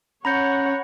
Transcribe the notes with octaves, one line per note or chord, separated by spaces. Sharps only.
C#4 C#5 F#5 A#5 B5 G6 A#6 C#7